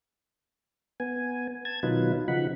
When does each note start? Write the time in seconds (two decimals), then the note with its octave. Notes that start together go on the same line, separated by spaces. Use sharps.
1.00 B3 G#5
1.65 A5 G#6
1.83 B2 D#3 F#3 D#4 F4 B4
2.28 C#3 F3 D#4 F#5 B5